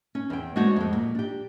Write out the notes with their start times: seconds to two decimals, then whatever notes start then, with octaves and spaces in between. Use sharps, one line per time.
0.15 C#4
0.30 E2 G5
0.56 G#3 A3 D4 F#4 C5 C#5
0.76 F2 G#3
0.93 A#2
1.15 D4 G4